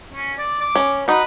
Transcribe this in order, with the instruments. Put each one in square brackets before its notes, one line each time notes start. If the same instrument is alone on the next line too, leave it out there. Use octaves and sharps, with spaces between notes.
[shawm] C#4
D5
D6
[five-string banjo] C#4
[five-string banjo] D#4 F#4 [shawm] B4